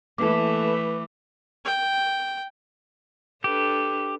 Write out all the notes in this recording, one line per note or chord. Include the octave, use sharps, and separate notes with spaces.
E3 A3 A#3 A4 B4 D6
G5
D4 G4 A4 B4